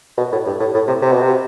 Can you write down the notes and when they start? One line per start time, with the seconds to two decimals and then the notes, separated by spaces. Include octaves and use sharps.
0.18 B2
0.32 A2
0.46 G2
0.60 A2
0.74 A2
0.88 C3
1.02 C3
1.12 B2
1.22 C3